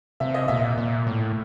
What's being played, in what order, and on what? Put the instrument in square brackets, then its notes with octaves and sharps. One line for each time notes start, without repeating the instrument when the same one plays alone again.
[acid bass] C3 [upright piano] E5
[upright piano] D#5
[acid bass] A#2 [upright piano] E5
[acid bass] A#2
A2